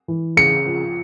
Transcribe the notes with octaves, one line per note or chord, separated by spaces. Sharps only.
E3
C#3 C#7
F3